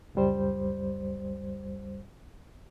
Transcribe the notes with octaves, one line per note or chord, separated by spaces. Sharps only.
C#2 F#2 G3 C5